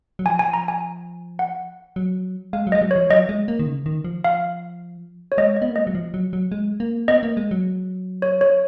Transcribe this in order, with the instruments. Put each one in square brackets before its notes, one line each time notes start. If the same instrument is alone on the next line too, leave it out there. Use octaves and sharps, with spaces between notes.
[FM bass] F#3
[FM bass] F3 [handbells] G#5
[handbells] G#5
A#5
G#5
F#5
[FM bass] F#3
[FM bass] G#3 [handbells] F5
[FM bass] F#3
[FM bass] G#3 [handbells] D#5
[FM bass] F#3
[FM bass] F3 [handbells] C#5
[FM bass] F#3 [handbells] D#5
[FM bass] G#3
A#3
D#3
C#3
D#3
F3
[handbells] F5
C#5
[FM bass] G#3 [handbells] D#5
[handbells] D#5
[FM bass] B3
A#3
[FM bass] G#3 [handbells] D#5
[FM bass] F#3
F3
F#3
F#3
G#3
A#3
[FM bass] B3 [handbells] D#5
[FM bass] A#3
G#3
F#3
[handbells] C#5
C#5